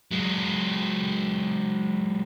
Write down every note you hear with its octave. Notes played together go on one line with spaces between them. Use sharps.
F#3 G#3